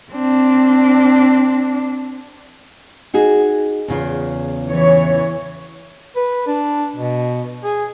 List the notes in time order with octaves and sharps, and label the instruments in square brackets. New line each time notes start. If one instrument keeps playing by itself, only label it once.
[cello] C4 D4
[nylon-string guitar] D#4 F#4 G#4
E2 C#3 F4
[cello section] E3 C#5
[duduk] B4
D4
B2
G#4